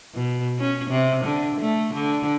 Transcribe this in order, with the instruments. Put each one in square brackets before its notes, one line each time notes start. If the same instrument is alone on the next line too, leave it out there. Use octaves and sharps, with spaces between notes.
[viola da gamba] B2
C#4
C3
D3
A3
D3